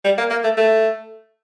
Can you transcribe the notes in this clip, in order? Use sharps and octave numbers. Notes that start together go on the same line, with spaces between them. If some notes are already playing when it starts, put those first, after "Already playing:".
G3
A#3
A#3
A3
A3